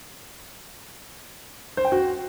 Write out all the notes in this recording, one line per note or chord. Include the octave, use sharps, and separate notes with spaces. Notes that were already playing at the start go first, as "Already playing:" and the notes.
C5
G5
F#4